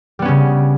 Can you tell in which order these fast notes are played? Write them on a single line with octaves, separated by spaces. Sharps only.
G3 B3 C#4 C#3